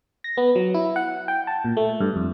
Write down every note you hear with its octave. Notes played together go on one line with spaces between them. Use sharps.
A#6
B3
F#3
E4
F#5
G5
A5
A#2
A3
G2
F2